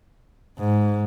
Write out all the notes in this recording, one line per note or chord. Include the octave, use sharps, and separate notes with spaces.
G#2